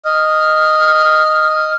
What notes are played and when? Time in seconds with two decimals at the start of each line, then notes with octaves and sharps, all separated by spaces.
0.05 D#5 F6